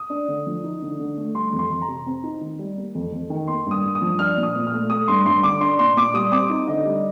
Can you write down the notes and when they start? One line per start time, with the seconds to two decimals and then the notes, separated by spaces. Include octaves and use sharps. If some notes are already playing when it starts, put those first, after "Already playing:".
Already playing: D#6
0.10 D4
0.28 D3
0.47 F3
0.64 D#4
0.82 D3
0.99 D3
1.17 A3
1.35 G3 C6
1.53 F2
1.59 C6
1.70 F2
1.82 A#5
1.88 C3
2.06 C4
2.23 D#4
2.41 D#3
2.59 G3
2.78 A#3
2.95 F2
3.12 F2
3.30 D#3
3.48 A#3 C6
3.66 G2
3.71 D#6
3.84 G2
3.95 D#6
4.02 F3
4.19 D4 F6
4.37 A#2
4.43 D#6
4.55 A#2
4.67 F6
4.72 A3
4.90 A3 D#6
5.08 G2 C6
5.25 G2 C6
5.43 D3 D6
5.61 D4 C6
5.79 A#2 C6
5.97 A#2 D6
6.14 G3 D#6
6.32 C4 D6
6.50 D#4
6.68 D3 D#5
6.85 G3